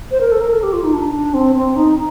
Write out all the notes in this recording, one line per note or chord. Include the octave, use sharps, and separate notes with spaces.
C5
A#4
A4
A#4
A4
G4
F4
D#4
D4
C4
C4
D#4